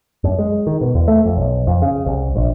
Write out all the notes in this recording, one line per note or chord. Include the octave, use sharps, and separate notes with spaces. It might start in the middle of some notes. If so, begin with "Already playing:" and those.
F#2
G#3
D#3
B2
E2
A3
F2
B1
F2
C#3
C2
A#1